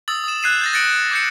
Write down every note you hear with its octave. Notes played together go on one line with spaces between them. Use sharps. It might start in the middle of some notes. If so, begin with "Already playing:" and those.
D#6 E6 A6 F#7
D#6 E7
F#6 G#6 C7 D#7 E7
G6 A6 A#6
A6 A#6 C#7 D7 F#7
D6 G6 C#7